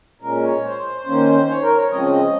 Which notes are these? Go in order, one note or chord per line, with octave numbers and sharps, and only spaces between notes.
A#2 G#3 C#4 A#4
C#5
C5
D#3 A#3 C#4
C#5
A#4
C#5
C#3 F3 G#3 C4 D#5